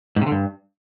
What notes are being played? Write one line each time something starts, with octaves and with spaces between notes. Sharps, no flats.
G#2
C3
D3
G2